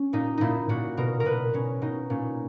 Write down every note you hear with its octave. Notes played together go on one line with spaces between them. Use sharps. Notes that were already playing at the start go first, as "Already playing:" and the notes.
Already playing: C#4
A#2 D#4
A#2 D#4 E4
A#2 F#4
B2 A#4
A#4
B2 B4
B2 C#4
B2 D#4
A#2 C#4